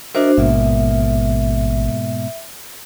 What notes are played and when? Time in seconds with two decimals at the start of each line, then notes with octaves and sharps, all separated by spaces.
0.15 D4 F#4 A#4 C5 D#5 E5
0.37 A1 G#2 B2 A#3 E5